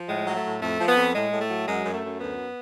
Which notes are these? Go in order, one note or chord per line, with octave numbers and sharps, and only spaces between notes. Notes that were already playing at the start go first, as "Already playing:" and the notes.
Already playing: F3
A2 G#3
F#3
A3
A2
F2 A3
F3
B3
F2
A2 G#3
A2
A3
F#3
F#2 G#3
F#2
A3
F#2
D2 B3